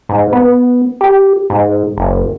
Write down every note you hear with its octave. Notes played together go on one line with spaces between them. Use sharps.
G#2
B3
G4
G#2
F#1